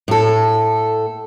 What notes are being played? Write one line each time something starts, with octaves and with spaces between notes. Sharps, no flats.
A2 A4